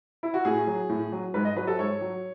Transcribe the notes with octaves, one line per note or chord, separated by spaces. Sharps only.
E4
F#4
A2 G#4
F#3
A2
F#3
G#2 B4
D#5
F#3 B4
A4
G#2 C#5
F#3